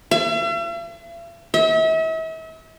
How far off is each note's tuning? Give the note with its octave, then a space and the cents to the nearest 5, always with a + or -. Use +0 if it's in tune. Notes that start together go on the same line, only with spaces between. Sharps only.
E5 +45
E5 -40